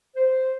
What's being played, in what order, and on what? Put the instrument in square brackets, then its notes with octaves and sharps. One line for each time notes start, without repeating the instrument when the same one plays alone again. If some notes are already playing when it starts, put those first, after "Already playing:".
[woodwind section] C5